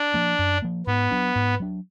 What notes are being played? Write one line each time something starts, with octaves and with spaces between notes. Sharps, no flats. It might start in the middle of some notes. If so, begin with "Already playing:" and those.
Already playing: D4
F3 A#3
F#2
F3 A#3
G#2 B3
F#3 D4
G#2
F#3 D4